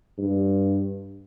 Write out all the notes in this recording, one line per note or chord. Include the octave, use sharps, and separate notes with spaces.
G2